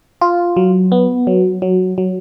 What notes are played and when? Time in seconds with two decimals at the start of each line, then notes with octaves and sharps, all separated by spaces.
0.21 F4
0.56 F#3
0.92 B3
1.27 F#3
1.62 F#3
1.98 F#3